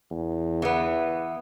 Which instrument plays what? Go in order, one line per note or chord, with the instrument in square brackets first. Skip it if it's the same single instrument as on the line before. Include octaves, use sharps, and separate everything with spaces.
[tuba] E2
[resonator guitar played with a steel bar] E3 B3